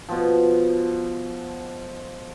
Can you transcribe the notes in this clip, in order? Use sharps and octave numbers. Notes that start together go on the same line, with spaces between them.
B2 F3